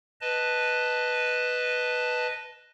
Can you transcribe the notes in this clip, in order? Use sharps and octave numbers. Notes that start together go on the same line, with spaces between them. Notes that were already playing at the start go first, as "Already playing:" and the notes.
B4 D#5 A5